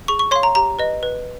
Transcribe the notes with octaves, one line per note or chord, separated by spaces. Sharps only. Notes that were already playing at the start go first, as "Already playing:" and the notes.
G#4 C#6
C#6
C#5 F5 C6
A#5
G4 A#5
B4 D#5
B4